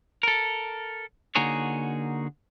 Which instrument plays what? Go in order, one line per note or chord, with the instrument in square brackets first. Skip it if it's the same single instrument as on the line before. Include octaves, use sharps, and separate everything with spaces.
[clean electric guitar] A4 A#4
D3 A#3 D#4 F#4 G#4 C#5